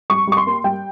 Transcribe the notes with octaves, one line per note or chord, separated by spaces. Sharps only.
G3 C#6
G3 C#6
C6
A#3
G3 G5